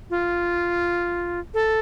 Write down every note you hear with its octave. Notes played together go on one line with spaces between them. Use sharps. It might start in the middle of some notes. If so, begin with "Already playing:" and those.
F4
A4